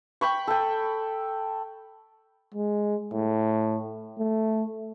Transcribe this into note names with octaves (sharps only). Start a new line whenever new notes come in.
G5 B5 C#6
A4 G5
G#3
A2
A3